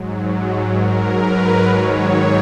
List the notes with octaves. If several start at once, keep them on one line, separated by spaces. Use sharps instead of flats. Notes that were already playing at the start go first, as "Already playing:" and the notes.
Already playing: G#2 F#3
A#4
B4
G#2 D#3 F#3 C#5